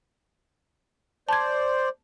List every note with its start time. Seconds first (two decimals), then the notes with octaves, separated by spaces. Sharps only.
1.29 C5 D5 A5 G#6